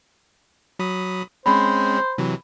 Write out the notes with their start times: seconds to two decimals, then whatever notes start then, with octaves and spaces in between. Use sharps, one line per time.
0.79 F#3 B5 D#6
1.46 G#3 C4 C#4 C5 B5
2.18 C3 E3 F#3